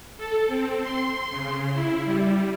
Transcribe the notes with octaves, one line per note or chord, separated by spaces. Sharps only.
A4
C4
C6
C#3
E4
G3